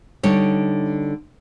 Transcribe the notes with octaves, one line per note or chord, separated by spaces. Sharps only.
D3 G3 D#4 C#5